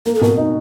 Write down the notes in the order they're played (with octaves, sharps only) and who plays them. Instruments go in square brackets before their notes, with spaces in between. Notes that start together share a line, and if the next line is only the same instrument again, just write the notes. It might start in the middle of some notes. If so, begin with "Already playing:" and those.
[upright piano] A#3 [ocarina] A#4
[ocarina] A4
[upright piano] B2 [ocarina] A#4
[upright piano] D#4